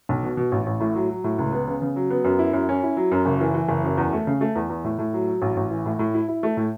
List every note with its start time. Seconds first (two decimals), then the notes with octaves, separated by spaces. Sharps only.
0.09 B1
0.23 B2
0.37 B2
0.52 A1
0.66 A1
0.80 A2
0.95 F#3
1.09 F#3
1.24 A2
1.39 C#2
1.52 B3
1.68 C#3
1.82 C#3
1.96 F#3
2.10 B3
2.24 F#2
2.39 E4
2.53 F#2
2.69 C#4
2.83 E4
2.97 F#3
3.11 F#2
3.26 F#1
3.40 E3
3.54 E3
3.69 F#1
3.83 F#2
3.98 E2
4.13 A3
4.27 C#3
4.41 A3
4.56 E2
4.70 E2
4.84 A2
4.99 A2
5.13 F#3
5.28 F#3
5.42 A1
5.57 A1
5.70 E3
5.86 A2
5.99 A2
6.14 E4
6.28 E4
6.43 A3
6.57 A2